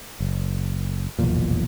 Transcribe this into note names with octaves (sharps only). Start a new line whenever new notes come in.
F#1
F1 B1 E2 A#2